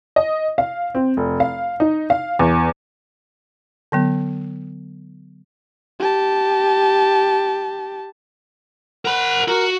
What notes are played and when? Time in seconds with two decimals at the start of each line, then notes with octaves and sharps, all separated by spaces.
0.16 D#5
0.58 F5
0.95 C4
1.17 F1
1.40 F5
1.80 D#4
2.10 F5
2.39 E2
3.92 D3 F#3 B3
6.00 G4 A5
9.05 A#4 F#5 B5
9.48 F#4 A#4